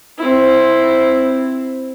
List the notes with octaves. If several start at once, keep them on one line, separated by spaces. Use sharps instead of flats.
C4 E4